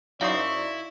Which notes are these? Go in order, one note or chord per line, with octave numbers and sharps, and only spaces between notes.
F#2 D#4 E4 C5 D5 F5 C#6